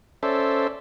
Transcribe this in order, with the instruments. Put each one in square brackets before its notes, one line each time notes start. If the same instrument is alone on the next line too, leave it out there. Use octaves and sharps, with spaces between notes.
[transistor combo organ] C#4 A4 C5 D5 E5